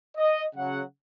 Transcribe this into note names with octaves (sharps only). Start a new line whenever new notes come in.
D#5
C#3 F#3 F#5